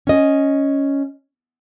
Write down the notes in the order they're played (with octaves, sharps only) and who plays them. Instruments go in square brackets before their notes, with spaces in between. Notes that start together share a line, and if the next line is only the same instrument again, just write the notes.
[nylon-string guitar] C#4 D#5